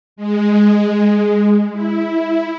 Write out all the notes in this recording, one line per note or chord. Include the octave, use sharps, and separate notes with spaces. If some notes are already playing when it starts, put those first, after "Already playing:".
G#3
E4